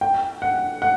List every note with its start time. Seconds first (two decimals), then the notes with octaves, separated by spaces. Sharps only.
0.01 G5
0.42 F#5
0.82 F#5